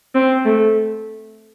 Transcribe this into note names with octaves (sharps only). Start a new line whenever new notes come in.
C4
A3